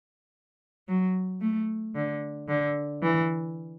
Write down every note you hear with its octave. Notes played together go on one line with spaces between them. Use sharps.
F#3
A3
D3
D3
E3